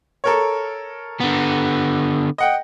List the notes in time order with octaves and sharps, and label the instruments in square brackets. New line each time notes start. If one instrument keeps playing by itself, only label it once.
[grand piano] A4 A#4 C#5
[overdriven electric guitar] D3 B3
[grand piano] D#5 F#5 G5